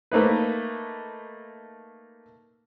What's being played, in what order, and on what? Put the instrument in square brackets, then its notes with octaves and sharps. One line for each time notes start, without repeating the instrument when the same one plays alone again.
[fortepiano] A3 A#3 D#4 B4